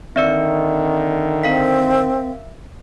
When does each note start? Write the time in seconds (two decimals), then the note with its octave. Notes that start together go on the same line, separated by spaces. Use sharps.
0.16 D3 D#3 C4 D5 E5 E6 C#7
1.43 C4 A#4 F5 B6